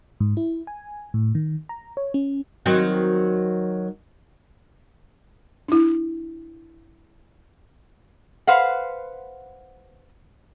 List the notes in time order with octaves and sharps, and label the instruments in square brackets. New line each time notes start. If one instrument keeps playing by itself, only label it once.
[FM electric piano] G#2
E4
G#5
A2
D#3
A#5
C#5
C#4
[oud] D#3 F#3 C4
[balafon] D4 E4
[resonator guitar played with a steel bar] B4 C5 F5 F#5